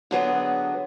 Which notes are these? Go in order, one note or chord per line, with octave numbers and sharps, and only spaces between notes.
D3 F#3 B3 G#4